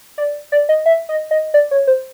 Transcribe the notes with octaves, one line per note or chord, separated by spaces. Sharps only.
D5
D5
D#5
E5
D#5
D#5
D5
C#5
C5